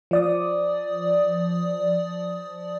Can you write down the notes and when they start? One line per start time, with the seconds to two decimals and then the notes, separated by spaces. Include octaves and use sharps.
0.11 F3 D5 D#6